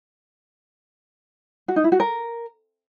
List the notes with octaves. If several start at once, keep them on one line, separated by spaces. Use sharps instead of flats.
F#4
D#4
E4
F#4
A#4